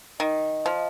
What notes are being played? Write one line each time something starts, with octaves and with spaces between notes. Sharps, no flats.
D#3 D#5
F3